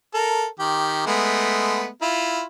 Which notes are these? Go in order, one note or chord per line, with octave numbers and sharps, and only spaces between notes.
A4 A#4
D#3 G4
G#3 A3 B3
E4 F4